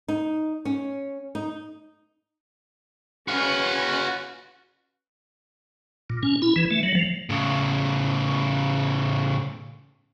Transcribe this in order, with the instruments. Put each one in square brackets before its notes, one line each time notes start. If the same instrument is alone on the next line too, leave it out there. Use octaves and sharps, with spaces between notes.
[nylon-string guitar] D#4
C#4
D#4
[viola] C#4 B4 [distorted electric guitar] F#4 F5
[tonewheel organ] A#2
C#4
E4
E3
A3
F#3
F3
[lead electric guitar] A2 C#3